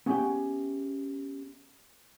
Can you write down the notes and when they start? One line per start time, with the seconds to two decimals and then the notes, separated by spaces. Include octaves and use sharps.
0.06 B3 C#4 G4 G#4 E5 G5